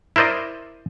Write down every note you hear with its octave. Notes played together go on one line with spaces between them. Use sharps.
E4 A#4 C5 D5 D#5